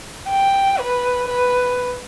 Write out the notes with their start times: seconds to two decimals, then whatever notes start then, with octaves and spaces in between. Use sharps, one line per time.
0.29 G5
0.79 B4
1.28 B4